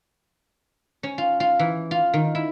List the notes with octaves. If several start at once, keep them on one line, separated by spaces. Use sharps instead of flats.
C#4
F4
F4
E3
F4
D#3
E4